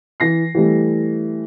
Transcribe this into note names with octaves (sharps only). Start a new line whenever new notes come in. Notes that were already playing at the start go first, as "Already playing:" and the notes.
E3 A#6 C7
E3 G3 A3